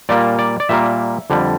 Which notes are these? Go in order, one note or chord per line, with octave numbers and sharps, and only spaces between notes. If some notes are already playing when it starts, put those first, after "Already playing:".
A#2 G3 A#3 D5
D5
D5
A#2 G3 A#3 E5
F2 D3 G3